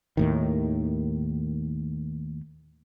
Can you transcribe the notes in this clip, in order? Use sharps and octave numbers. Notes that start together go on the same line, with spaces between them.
D#2 A2 D#3